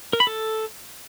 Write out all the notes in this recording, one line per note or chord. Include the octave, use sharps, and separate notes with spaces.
A#4
B5
A4